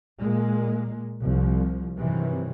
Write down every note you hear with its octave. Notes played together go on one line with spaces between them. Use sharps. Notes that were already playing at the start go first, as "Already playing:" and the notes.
A#2 G#3 A#3
C2 F3
G2 C3 D#3 E3 F#3